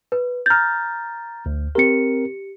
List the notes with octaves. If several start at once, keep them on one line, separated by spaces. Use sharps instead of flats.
B4
A#5 F6 G6 A6
D2
C4 G4 A#4 C#7